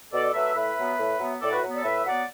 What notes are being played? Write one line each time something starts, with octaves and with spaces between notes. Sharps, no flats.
B2 A4 D5
D5
F#3 A3 B4 E5
A2 B4 E5
F#3 B3
A2
F#3 B3
A2 A4 D5
F#4 B4
F#3 B3
A4 D5
A2 B4 E5
F#3 B3 D5 F#5